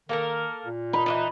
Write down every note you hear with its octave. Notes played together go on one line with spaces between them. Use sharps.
D#3 A#3 A4 A#4
A#2
D#4 B5
E3 F3 D#4